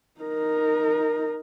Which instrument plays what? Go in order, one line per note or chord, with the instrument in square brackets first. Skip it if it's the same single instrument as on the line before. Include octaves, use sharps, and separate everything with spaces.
[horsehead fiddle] D#4 A#4